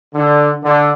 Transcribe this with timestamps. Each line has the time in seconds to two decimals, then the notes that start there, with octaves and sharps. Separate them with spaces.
0.15 D3
0.63 D3